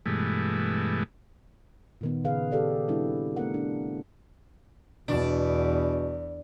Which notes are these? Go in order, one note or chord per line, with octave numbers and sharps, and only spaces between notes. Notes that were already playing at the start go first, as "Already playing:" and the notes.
G2 B2 E3 G#3 A3
A#2 D#3 B3
C#3 G#4 B4 F5
G4 A4 D5 F5
D#3 G3 C4 D4 E4
A3 B3 A#4 F#5
D4
E2 B2 D4